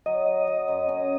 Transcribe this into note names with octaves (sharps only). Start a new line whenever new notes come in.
F#3 D#5
F#3
F#3
F#2
C#4